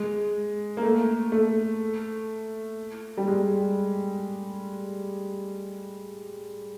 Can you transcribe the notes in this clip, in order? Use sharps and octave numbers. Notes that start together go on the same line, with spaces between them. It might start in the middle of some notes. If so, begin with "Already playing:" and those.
Already playing: G#3
A#3
A3
A3
G3
G#3